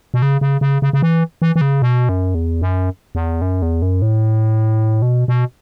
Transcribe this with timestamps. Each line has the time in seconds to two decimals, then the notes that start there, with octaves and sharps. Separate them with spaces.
0.14 B2
0.22 C#3
0.41 C#3
0.61 C#3
0.82 C#3
0.93 C#3
1.02 E3
1.42 E3
1.56 E3
1.61 C#3
1.82 B2
2.09 F#2
2.35 E2
2.62 F#2
3.15 E2
3.42 F#2
3.62 E2
3.82 F#2
4.02 A2
5.02 B2
5.28 B2